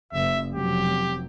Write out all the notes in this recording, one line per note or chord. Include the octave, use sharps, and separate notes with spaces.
F#1 F#2 E5
F1 F#3 G4